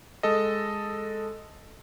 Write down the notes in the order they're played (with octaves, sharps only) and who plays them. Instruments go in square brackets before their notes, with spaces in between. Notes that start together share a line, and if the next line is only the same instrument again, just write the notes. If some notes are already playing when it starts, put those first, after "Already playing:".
[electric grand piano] G#3 A4 D#5